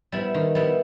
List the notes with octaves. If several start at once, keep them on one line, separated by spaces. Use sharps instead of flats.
G3 B3 E4
D#3
G3 B3 E4